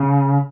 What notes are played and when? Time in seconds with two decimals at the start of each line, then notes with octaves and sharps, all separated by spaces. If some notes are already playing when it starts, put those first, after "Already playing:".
Already playing: C#3